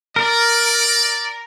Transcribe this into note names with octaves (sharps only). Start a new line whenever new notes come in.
A#4 D5